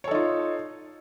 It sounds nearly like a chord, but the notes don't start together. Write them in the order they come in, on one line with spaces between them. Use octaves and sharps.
C#5 A4 D#4 F4